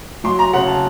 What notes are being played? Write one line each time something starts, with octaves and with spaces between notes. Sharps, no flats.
F#3 C6
A#5
C#3 F#5
A5